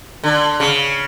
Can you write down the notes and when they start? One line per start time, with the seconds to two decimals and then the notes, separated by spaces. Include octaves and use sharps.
0.23 D3
0.60 C#3